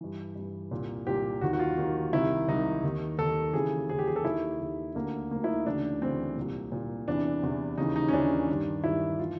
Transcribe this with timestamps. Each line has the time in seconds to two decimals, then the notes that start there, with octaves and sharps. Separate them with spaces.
0.01 G2 E3
0.36 G2 E3
0.71 C2 A#2
1.07 C2 A#2 G4
1.41 D#2 D#3 F#4
1.53 F#4
1.59 F4
1.78 D#2 D#3
2.13 C2 C3 D#3 E4
2.48 C2 C3 D#3 D#4
2.83 D#2 D#3
3.18 D#2 D#3 A4
3.53 D#2 C#3 E3 G#4
3.89 D#2 C#3 E3 G#4
3.99 G4
4.08 G#4
4.16 A4
4.24 D#2 D#3 E4
4.61 D#2 D#3
4.95 D2 D3 A#3
5.31 D2 D3 A#3
5.44 E4
5.48 D#4
5.66 D2 C#3 E3 D4
6.02 D2 C#3 E3 C4
6.36 C2 A#2
6.72 C2 A#2
7.08 E2 C3 E3 D4
7.43 E2 C3 E3
7.78 D#2 C#3 E3 D#4
7.96 D#4
8.08 C#4
8.13 D#2 C#3 E3 D4
8.49 G2 D#3
8.84 G2 D#3 E4
9.19 E3 F4